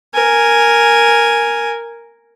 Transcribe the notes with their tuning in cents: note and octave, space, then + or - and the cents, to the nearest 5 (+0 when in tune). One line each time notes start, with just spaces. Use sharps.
A#4 +0 G#5 +0